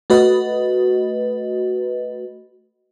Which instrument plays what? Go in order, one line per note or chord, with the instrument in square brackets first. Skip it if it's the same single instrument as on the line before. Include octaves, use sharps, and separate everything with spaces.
[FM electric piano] A3 F#4 B4 D#5